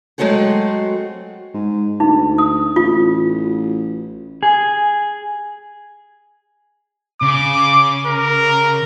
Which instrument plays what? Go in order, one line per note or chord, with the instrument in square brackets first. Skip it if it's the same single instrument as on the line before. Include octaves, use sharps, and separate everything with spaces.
[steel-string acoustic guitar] F#3 G#3 A3 C4 F#4 G#4
[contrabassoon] G#2
[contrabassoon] D2 [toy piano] D#4
[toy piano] D#6
[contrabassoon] A1 [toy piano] F4
[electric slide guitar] G#4
[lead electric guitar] C#3 [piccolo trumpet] D6
[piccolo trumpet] A#4